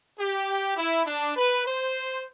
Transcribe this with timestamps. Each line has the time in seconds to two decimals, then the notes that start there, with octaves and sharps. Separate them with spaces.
0.18 G4
0.77 E4
1.06 D4
1.36 B4
1.65 C5